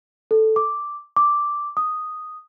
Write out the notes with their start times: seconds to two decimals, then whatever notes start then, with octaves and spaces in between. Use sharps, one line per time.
0.31 A4
0.56 D6
1.16 D6
1.77 D#6